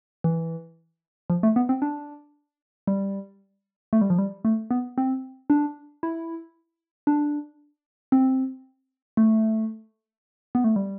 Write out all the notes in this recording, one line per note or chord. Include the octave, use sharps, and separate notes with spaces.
E3
F3
A3
B3
C4
D4
G3
A3
G3
F3
G3
A3
B3
C4
D4
E4
D4
C4
A3
B3
A3
G3